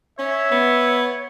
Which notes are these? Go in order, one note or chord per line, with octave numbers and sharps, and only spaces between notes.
C#4 C#5 E5
B3